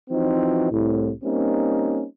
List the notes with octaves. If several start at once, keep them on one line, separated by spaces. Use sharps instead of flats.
E3 F3 C4 D#4 F#4
C2 A2
G3 A#3 C4 C#4 D#4